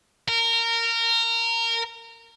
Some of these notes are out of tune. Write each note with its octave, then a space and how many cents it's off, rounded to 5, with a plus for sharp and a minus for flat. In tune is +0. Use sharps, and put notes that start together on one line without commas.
A#4 -20